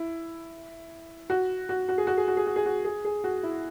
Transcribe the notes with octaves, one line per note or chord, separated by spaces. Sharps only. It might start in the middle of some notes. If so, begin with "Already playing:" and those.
Already playing: E4
F#4
F#4
F#4
G#4
F#4
G#4
F#4
G#4
F#4
G#4
F#4
G#4
G#4
F#4
E4